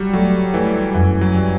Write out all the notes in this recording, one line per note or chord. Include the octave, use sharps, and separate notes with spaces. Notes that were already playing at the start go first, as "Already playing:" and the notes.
Already playing: F#3 G3
F#3 A3
E3 A3
F#2 E3
F#3
G3